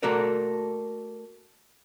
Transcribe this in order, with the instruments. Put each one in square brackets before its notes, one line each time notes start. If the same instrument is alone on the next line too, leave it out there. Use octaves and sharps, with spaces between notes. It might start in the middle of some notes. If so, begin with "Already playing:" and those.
[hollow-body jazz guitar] A3 A#3 F#4 A4 A#4 D5